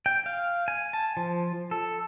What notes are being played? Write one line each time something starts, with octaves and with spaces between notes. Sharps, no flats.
G5
F5
G#5
A5
F3
A4